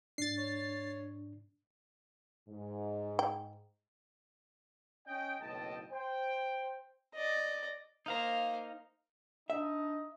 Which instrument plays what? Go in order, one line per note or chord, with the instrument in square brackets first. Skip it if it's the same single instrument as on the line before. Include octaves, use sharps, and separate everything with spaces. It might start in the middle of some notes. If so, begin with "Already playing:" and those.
[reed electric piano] G#2 D4 [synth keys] A6 C7
[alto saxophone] C#5
[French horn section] G#2
[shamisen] G5
[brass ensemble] C#4 D#5 G5
F#1 B1 A2 D#5 G5 A5
C5 G5
[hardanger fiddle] D5 D#5
[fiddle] A#3 C5 [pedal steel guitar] D#4 F5 A#5
[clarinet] D4 [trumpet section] D#4 D#5 [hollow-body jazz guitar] E5